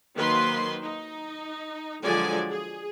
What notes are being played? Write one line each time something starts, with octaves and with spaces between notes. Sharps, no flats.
D#3 F#3 A#3 B4 C5 C6
D#4
D3 F3 F#3 G#3 D5 G#5
G#4